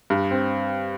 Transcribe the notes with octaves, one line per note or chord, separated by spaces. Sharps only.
G2
C4